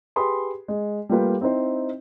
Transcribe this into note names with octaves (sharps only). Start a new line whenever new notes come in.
G4 G#4 B4 B5 C6 D#6
G#3
G3 A3 A#3 F4 B4 G5
C4 D#4 E4 C5